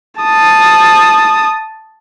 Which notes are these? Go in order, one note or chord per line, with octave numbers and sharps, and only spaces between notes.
A5 D#6